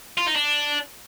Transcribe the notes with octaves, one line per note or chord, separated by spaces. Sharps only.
F4
D#4
D4